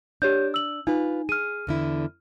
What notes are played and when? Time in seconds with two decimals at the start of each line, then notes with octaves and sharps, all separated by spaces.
0.22 D4 G4 C#5 G6
0.54 E6 F#7
0.87 D#4 F4 B4
1.29 G#4 F6 D#7
1.67 E2 D3 E4